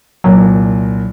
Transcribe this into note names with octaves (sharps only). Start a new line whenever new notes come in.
C2 A#2 F#3